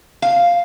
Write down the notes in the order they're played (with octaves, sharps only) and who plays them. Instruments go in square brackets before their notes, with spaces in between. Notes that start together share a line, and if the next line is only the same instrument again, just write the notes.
[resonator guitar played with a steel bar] F5